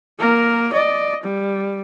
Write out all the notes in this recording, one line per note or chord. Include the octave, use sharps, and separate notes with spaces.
A#3 A#4
D5 D#5
G3